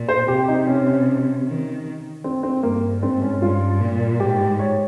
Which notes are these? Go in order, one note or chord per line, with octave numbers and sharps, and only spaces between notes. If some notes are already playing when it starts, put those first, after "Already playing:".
Already playing: A#2
C5
C3 G4
D#4
C#4
D#3
C4
C4
G2 A#3
G#2 C4
C#4
G2 F4
A#2
G#2 G4
C#5